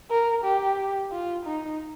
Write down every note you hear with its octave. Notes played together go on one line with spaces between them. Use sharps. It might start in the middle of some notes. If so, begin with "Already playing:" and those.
A#4
G4
F4
D#4